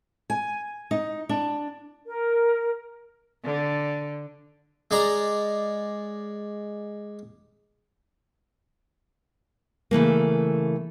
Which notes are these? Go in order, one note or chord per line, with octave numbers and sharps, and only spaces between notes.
G#5
D#4
D4
A#4
D3
G#3 D5 A#5
C#3 E3 A3 A#3